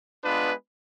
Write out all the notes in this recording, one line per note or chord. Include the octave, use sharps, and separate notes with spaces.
G#3 B3 D4 F4 B4